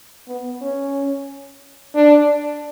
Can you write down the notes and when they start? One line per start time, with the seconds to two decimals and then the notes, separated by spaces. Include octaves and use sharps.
0.28 B3
0.61 C#4
1.95 D4